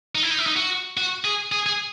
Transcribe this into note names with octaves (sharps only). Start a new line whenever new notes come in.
D#4
E4
D#4
E4
D#4
F#4
F#4
G#4
G#4
G#4